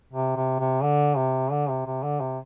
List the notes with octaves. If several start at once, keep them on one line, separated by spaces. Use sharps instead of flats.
C3
C3
C3
D3
C3
D3
C3
C3
D3
C3